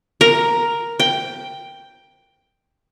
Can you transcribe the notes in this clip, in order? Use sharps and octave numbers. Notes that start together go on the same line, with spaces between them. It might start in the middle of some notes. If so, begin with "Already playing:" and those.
A#4
G5